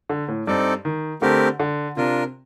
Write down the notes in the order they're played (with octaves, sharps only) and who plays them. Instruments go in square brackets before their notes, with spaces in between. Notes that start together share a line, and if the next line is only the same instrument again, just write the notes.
[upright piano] D3
A2
[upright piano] G2 [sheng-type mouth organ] C4 D#4 A4 D5
[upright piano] D#3
[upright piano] D3 [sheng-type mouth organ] A3 C4 G4 A#4
[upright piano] D3
[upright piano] C3 [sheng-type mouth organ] D4 F4 A#4